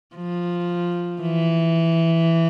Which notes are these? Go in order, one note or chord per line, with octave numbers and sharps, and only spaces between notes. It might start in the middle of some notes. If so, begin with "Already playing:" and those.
F3
E3